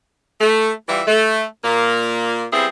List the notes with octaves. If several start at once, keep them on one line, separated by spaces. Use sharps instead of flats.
A3
E3 G3 E4 F4 E5
A3
A#2 A#3
G3 B3 C4 E4 G#4